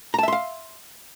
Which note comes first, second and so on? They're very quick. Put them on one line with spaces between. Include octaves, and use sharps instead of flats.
A#5 A5 E5 C6 F5